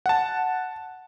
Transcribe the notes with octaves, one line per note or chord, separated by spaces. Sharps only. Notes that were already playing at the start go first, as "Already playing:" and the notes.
F#5 A5